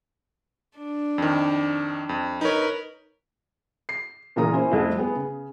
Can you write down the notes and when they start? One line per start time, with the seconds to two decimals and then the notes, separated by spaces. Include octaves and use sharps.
0.77 D4
1.18 F2 D#3
2.09 F2
2.41 D#4 A#4 B4 C#5
3.89 C7
4.36 A#2 C#3 E3 A#4 A#5 D#6
4.54 C#4 E4 C5
4.72 C2 F2 A3
4.98 B3 G#4
5.16 C#3